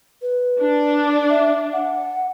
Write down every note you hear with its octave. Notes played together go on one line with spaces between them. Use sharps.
B4
D4
E5
F#5